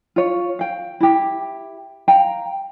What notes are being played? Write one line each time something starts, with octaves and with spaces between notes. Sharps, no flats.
F4 C#5
F5 G5
E4 G4
F5 G5 A#5